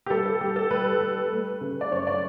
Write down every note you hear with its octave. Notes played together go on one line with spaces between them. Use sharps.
G4
G3 A4
A4
G3 G4
A4
G3 B4
G3
A3
C#3
D5
F#2 C#5
D5